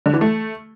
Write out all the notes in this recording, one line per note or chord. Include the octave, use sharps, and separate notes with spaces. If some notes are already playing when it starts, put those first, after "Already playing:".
D3
E3
A3